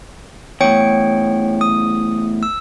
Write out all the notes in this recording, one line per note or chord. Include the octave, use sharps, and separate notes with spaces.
E2 A2 C#5 G5 C#7
D#6
E6